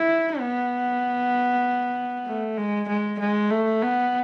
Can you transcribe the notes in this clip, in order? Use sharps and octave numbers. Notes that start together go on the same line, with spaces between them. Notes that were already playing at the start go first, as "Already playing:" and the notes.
Already playing: E4
B3
A3
G#3
G#3
G#3
A3
B3